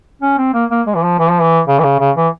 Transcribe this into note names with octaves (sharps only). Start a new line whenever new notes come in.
C#4
C4
A#3
A#3
G#3
E3
F3
E3
F3
E3
C#3
E3
C#3
C#3
E3